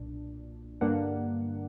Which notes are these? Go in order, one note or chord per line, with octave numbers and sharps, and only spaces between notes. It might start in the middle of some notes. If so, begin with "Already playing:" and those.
Already playing: B1 A#2 D4
G2 D3 A#3 D4 F#5